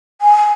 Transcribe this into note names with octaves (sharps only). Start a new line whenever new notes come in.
G#5